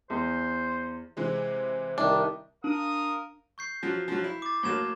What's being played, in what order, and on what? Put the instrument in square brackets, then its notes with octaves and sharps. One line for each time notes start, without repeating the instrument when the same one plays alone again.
[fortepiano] E2 [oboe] C5
[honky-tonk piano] C3 E3 G#3 [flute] C5
[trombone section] C2 D#3 [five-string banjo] D4 [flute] E5
[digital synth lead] D4 [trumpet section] A#4 F5 D#6
[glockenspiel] C#6 G6 C7
[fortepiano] F3 F#3
F3 F#3
E4
[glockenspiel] D6 A6
[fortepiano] A2 F#3 A#3 [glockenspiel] C#6 G#6 E7